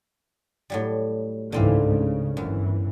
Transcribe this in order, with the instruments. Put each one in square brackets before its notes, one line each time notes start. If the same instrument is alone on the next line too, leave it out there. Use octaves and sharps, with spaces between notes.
[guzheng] A2 F#3 G3
[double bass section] C#2 G#2 E3 [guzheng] D3 C4 F5
[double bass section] C#3
[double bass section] G1 E3 [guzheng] F#2